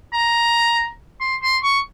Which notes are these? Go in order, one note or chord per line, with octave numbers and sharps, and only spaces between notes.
A#5
C6
C6
C#6